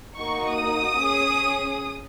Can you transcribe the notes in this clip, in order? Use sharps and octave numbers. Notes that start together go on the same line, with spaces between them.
A#3 D#4 F#4 C#6
D#6
C#4 G#4